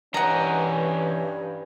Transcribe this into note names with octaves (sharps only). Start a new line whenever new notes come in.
G2 E3 C#4 D#5 F#5 A#5